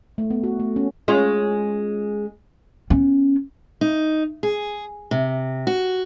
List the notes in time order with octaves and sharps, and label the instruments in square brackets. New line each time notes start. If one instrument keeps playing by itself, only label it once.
[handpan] A3
B3
F#4
A3
C#4
[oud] G#3 C#4 F4
[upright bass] B3 C#4
[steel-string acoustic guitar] D#4
G#4
C3
F#4